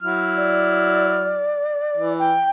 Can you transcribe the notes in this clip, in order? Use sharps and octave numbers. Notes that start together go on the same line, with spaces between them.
F#3 E4 F6
D5
E3
G5